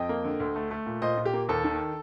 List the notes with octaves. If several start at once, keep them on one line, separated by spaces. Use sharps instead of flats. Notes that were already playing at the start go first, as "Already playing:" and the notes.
Already playing: F2 D#5 G5
A#3
D3
D2
A3
A3
A#2
A#2 C5 D#5
A#2
G4
A#3
D#2 A4
D#3